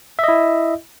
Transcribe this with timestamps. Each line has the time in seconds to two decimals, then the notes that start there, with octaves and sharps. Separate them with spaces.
0.19 E5
0.24 D#5
0.28 E4